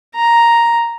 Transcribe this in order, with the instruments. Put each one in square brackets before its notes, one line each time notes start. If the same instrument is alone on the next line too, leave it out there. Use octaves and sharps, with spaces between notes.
[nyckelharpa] A#5